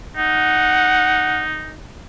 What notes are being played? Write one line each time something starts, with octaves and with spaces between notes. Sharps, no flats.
D#4 F#5